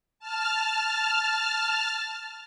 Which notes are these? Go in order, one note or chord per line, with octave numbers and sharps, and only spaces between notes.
A5 F6